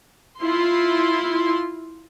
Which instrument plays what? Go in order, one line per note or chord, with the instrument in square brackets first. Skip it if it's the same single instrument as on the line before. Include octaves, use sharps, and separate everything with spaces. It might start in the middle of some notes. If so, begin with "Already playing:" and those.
[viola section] E4 F4 C6